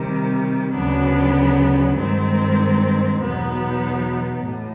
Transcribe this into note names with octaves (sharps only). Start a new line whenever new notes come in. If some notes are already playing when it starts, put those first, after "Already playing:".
Already playing: C3 D#3 G3
D2 C#3 F#3 B3 D4
G2 D#3 G#3 C4
E2 B2 F#3 B3 D#4
A2